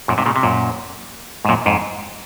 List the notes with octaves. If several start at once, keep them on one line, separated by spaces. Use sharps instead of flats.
F#2 A#2
G#2 C3
A#2 C#3
C3
F#2 A#2
G#2
F#2 A#2
F2 G#2